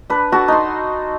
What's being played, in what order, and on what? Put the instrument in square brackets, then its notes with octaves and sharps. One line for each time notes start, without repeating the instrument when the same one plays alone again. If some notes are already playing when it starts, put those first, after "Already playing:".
[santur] D4 B4
D4 F#4 A4 A5
D#4 F#5 C6